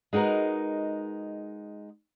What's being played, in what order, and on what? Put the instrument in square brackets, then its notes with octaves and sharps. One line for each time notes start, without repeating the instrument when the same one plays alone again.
[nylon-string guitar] G#3 D#4 F#4 A#4 B4